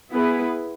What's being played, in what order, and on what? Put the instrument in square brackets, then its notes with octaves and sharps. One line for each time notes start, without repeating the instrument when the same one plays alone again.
[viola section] B3 E4 G#4 B4